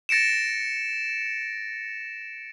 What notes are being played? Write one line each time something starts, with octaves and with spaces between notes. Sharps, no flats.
A6 A#6 C#7 D7 E7